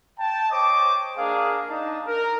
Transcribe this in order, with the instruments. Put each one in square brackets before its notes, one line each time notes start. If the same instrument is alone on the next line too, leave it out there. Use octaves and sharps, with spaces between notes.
[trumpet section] G5 A5
C5 C#5 D#5 G5 A5 D6
A#3 D4 G#4 A#4 F5
D4 D#4 A5
A#4